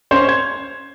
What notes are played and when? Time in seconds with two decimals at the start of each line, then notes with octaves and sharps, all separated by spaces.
0.11 C#4 C5 C#5
0.29 G#6